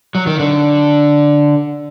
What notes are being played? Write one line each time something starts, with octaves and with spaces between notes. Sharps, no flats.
F#3
D#3
D3